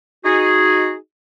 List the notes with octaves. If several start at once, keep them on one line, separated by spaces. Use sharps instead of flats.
D#4 F#4 G#4